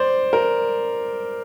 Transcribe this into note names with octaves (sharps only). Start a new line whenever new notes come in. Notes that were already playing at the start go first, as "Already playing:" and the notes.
Already playing: C5 D5
A#4